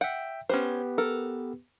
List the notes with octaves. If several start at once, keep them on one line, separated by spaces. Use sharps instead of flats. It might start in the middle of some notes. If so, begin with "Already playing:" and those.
E5 F#5 G5
B3 C#4 G4 B4 C5
A4 A#4